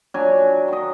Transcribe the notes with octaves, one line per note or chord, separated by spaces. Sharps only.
F#3 D4 D5 G#5
D#3 D#5